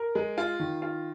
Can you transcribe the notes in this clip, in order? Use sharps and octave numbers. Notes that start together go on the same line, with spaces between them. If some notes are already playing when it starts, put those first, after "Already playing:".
Already playing: A#4
G#3
F4
D#3
F4